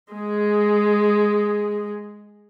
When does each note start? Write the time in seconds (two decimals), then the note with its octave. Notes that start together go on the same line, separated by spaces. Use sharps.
0.13 G#3 G#4